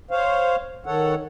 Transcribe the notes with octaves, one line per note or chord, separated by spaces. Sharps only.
C5 C#5 F5
D#3 A4 C#5 F#5